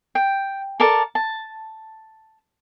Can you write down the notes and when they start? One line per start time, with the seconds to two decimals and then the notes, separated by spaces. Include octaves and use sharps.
0.15 G5
0.80 A4 A#4 D5 A5
1.15 A5